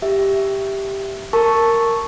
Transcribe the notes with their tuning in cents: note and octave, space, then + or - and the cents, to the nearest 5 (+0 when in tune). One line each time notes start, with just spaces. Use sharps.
G4 +0 E5 +0
A#4 -10 A5 +0 C#6 +0